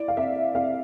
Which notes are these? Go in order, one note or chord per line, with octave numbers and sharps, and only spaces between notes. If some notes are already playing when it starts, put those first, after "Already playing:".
Already playing: E4 D5
F5
C4 E5
C4 F5